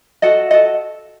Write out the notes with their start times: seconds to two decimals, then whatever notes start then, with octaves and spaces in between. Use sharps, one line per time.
0.22 F#4 A4 D#5 F#5
0.51 F#4 A4 D#5 F#5